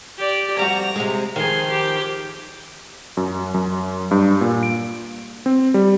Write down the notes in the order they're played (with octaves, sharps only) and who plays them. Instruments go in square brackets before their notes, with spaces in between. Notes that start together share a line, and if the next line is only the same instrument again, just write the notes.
[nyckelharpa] G4 D5
[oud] F2 G3 F#4 [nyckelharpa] A#5
[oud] C3 G#3
[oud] D#3 F3 [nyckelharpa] G#4 C6
[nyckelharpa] G4
[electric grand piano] F#2
F#2
G2
A#2
D7
C4
G3